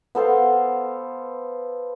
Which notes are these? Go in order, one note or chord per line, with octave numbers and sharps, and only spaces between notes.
B3 A4 C5 F5